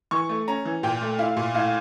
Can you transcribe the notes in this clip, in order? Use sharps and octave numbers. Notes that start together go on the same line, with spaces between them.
E3 C#6
A3
C#4 A#5
E3
A#2 G5
A3
E4 F5
A#2
A2 F5